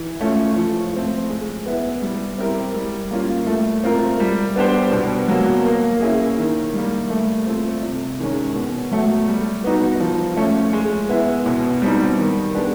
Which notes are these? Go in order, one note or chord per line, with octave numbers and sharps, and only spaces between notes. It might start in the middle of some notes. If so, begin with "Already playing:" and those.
Already playing: E3
A3 C#4 F4
F3
A3 C4
G#3
B3 E4
G3
C4 E4 G4 A#4
G3
A#3 C#4 F4
A3
C4 F4 A#4
G3
B3 D4 G4 C5
B2
F#3 A#3
A#3
C#4 E4 G#4
D#3
G3 A#3
A3
C4 F4 A4
C3
D#3 G#3 C#4
B2
F#3 A3
G3
B3 D#4 F#4
F3
A3 C#4
G#3
B3 E4
B2
G3 C4 D#4
D#3
G#3 B3 D4 G4